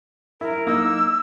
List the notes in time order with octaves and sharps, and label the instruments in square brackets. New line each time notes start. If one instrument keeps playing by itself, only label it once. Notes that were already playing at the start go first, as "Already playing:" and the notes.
[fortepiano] E4 [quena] A#4
[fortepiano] A#3 D#4 [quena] E6